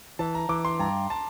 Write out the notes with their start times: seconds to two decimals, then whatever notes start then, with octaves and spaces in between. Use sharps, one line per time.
0.19 E3 A5
0.35 A#5
0.49 E3 D6
0.65 C6
0.79 G2 A#5
1.10 A5